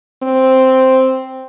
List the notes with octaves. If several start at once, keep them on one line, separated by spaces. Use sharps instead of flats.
C4